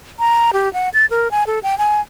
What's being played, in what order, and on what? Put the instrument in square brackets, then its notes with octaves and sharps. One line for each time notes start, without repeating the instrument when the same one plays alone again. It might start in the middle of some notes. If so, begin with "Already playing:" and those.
[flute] A#5
G4
F#5
A6
A#4
G#5
A4
G5
G#5